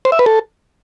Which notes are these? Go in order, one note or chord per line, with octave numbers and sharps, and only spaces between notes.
C5
E5
B4
A4